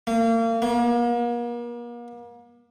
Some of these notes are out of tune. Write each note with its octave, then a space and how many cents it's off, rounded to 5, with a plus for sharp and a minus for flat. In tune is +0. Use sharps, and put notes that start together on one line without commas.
A#3 -35
A#3 +40